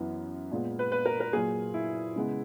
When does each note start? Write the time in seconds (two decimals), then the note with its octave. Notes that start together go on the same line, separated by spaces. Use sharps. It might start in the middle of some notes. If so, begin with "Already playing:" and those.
Already playing: F#2 E3 B3
0.52 A#2 G#3 B3
0.79 B4
0.92 B4
1.05 A#4
1.20 A#4
1.33 A#2 F#3 A#3 G#4
1.74 E4
2.16 C#3 G#3 B3